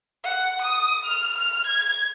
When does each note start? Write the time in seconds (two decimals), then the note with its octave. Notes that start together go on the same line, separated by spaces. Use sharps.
0.24 F#5
0.62 D#6
1.06 F6
1.38 F6
1.67 G#6